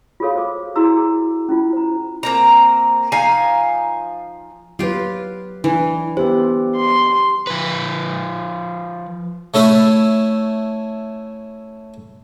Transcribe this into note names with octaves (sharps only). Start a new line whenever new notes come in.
F4 F#4 G#4 A4 C#5 F5
C5 D6
E4 F#4 G#4 A#5 E6
G#4
C#4 E4 F4
C5 A#5
A#3 C4 A#5
F3 D#4 F5 G#5
F#3 F4 G4 B4
E3 D4
B3 G4 B4 C5
C6
F3 B4
A3 C#4 E4 E5